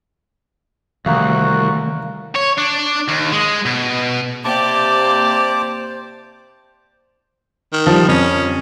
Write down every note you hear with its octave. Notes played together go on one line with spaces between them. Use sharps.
C2 D#3 E3 A3 F#4 F5 A#5
C#5
D4
D#2
G#3
B2
C3 A#3 G4 C5 D5 A5 D6
D#3
F3 G3
F2 C#4